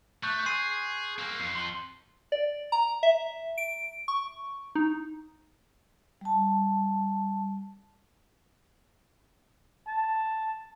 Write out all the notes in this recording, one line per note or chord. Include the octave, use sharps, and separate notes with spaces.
A3 C#6 F#6 G6
G#4 C6 C7 D#7
A#3 C4
F2 C7
C6 F#7 G7
D5
A#5
E5
D7
C#6
D#4
G3 A5
A5